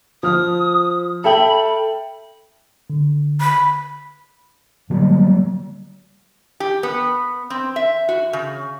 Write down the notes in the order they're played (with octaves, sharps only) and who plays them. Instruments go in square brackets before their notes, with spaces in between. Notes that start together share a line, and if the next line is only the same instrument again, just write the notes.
[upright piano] F3 F6 [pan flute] D#6
[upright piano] A4 E5 G5 [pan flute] B5
[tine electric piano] D3
[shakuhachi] B5
[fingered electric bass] D3 F#3 G3 A#3
[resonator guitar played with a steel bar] G4
B3
C4
E5
F#4
C#3